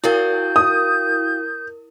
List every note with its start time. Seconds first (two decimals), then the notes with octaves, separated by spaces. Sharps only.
0.04 E4 F#4 A#4 F5 G5 G6
0.56 D#6